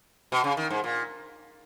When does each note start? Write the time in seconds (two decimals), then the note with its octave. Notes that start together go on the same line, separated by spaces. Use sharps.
0.32 B2
0.44 C#3
0.57 D#3
0.70 G#2
0.84 A#2